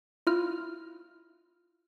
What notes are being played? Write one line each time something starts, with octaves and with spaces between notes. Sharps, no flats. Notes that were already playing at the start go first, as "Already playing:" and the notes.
E4 F4 F6